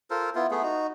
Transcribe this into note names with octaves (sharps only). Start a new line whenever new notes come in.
F4 A4 A#4 C5
B3 E4 F4
A3 B3 G#4
D#4 F#4